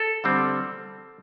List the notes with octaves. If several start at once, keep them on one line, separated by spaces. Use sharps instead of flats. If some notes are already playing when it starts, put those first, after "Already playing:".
Already playing: A4
D3 G3 C4